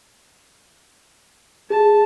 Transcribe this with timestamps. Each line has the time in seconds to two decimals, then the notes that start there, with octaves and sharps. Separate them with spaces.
1.70 G#4 A5